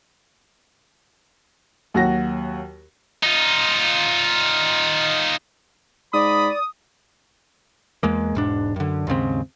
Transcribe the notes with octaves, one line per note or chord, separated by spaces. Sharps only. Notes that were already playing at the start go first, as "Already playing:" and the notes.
D#2 F#3 F#4 A#6
D#4 F4
G#2 D5 B5 D#6
E2 G#3 A#3
E1 G#2 D4
F#2 D3
D#2 G#2 C#3 C4